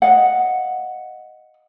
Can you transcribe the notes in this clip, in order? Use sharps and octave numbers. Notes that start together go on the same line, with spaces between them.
D#5 F5 F#5